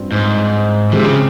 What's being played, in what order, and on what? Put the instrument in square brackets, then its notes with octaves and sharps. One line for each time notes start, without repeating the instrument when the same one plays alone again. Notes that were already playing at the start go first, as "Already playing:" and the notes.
Already playing: [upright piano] G2 F3 C4 F4
[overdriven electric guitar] G#2
[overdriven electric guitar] C3 [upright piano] F3 G#3 C4 G4
[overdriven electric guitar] C#3